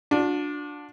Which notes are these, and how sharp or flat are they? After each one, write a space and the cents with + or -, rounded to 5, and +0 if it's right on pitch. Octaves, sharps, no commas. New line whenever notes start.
D4 +0 F#4 -45